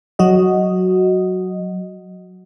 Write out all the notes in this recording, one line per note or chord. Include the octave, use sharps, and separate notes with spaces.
F#3 F#4 D#5